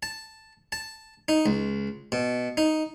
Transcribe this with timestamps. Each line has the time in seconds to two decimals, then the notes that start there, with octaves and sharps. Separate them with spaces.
0.03 A5
0.72 A5
1.28 D#4
1.46 C#2
2.12 B2
2.57 D#4